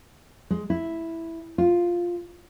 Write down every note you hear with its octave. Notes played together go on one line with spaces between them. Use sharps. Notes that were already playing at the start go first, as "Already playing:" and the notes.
G#3
E4
F4